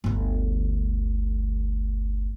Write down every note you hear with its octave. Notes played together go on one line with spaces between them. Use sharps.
G1 D2